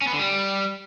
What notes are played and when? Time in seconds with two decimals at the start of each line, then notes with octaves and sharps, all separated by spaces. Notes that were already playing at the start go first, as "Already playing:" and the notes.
0.01 C#4
0.07 B3
0.13 D3
0.19 G3